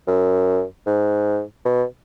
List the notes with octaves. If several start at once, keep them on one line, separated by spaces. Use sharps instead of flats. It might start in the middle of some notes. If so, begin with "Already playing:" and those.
F#2
G#2
B2